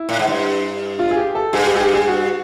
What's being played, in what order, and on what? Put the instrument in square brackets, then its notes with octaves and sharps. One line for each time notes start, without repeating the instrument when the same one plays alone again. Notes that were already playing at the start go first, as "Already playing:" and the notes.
Already playing: [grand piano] E4
[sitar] A2
G#2
G2
[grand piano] F4
G#4
G4
A4
[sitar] G2 [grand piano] G#4
[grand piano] G4
G#4
G4
G#4
F#4